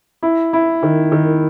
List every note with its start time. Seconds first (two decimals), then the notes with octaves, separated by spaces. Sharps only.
0.23 E4
0.53 E4
0.83 D#3
1.12 D#3